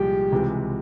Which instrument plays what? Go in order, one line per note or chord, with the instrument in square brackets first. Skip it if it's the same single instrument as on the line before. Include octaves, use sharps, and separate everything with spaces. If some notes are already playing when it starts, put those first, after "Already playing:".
Already playing: [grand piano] C2 A#2 F3 G#3 [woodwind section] G4
[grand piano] C#2 C3 E3 G#3